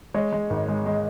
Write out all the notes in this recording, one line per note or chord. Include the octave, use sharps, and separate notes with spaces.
G#3 C#5
G#3
G#1
G#3
G#3